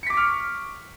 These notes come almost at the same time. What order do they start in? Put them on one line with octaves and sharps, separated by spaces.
C#7 B6 D6 C#6 F6